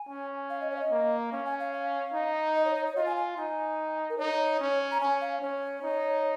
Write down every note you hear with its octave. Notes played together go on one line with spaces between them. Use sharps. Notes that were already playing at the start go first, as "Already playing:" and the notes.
Already playing: G#5
C#4
F5
D#5
C#5
F5
D#5
A#3
C#4 F5
G#5
F5
F5
D#4
D#5
C#5
C#5
C#5
F4 D#5
G#5
G#5
D#4 G#5
A#4
D#4 C#5
C#4
A#5
C#4 G#5
F5
C#4 C#5
D#4